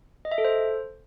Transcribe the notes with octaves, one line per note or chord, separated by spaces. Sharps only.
D#5
E5
A4
C5